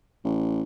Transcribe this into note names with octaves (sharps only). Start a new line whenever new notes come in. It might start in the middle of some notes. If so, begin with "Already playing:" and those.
A1